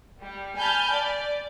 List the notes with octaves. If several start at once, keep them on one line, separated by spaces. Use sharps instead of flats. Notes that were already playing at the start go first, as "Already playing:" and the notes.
G3
G#5 A5 B5 F6 G6 A6
D5